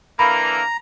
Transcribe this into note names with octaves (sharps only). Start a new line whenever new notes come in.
D3 E3 A#3 A#5 B5